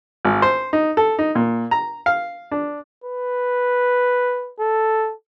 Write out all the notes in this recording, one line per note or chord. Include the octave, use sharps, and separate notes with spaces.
G#1
C5
D#4
A4
D#4
A#2
A#5
F5
D4
B4
A4